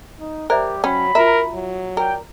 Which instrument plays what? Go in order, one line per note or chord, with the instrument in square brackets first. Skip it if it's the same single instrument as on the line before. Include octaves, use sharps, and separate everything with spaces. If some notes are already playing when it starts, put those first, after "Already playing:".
[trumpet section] D#4
[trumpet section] G3 G4 [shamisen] A#4 [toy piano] C5 D5 E5
[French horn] F#3 [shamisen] C#4 [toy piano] G5 [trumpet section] B5
[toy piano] F4 F#4 A#5 [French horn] A#4 [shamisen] E5
[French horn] F#3
[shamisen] A#4 [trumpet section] D5 G5